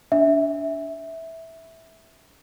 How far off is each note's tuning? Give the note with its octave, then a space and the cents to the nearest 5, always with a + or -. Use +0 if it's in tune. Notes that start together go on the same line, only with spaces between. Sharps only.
D4 -25 E5 -10